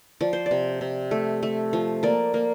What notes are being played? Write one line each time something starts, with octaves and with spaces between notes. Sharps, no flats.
F3 D5
C5
D5
C3
C3
A3
A3
F3
A#3 D5
A#3